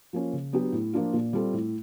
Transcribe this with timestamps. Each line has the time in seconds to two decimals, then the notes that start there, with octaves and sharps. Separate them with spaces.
0.13 F3 A#3 C#4
0.33 C#3
0.53 F#3 B3 D4 G4
0.72 A2
0.93 F3 A#3 D4 F4
1.13 A#2
1.33 G3 C4 F4 A4
1.54 A2